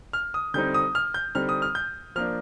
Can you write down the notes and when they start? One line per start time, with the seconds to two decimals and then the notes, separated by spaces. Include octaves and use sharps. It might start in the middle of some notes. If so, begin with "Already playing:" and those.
0.13 F6
0.34 D#6
0.54 D3 G3 C4 D#4 G6
0.74 D#6
0.95 F6
1.14 G6
1.35 D3 G3 C4 D#4 F6
1.49 D#6
1.62 F6
1.75 G6
2.16 F3 A#3 D4 F6